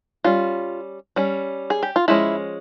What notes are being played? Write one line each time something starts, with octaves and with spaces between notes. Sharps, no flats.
G3 C#4 F4
G3 C#4
G#4
G4
F4
F3 G#3 C#4 E4